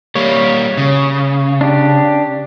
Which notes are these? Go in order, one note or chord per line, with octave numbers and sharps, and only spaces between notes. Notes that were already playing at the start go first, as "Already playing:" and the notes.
G3 A#3 C#5
C#3
D4 G4